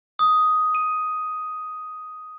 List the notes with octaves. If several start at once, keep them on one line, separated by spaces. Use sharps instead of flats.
D#6
D#7